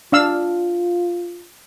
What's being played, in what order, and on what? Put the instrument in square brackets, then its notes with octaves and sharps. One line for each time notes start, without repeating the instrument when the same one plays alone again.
[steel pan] D4 F5 E6 [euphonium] F4